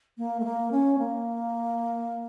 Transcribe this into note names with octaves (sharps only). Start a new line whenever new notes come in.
A#3
A3
A#3
C#4
A#3